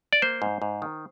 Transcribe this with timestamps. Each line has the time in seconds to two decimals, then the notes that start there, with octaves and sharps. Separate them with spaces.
0.13 D5
0.22 A#3 C5
0.42 G#2
0.62 G#2
0.82 D#3